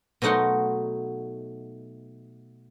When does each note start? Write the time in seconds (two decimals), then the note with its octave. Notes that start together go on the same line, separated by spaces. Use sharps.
0.22 B2 F#3 A3 D#4 F#5 C6